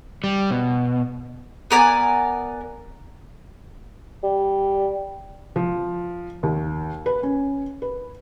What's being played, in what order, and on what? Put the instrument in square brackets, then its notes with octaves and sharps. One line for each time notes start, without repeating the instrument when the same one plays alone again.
[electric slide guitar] G3
B2
[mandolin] B3 A#4 D5 G#5
[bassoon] G3
[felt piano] F3
D#2
B4
C#4
B4